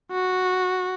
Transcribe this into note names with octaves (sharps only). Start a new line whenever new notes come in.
F#4